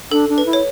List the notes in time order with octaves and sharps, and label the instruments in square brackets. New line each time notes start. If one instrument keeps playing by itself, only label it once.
[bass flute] D4 [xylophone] A4
[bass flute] D4
[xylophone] B4
[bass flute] E4
[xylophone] C#5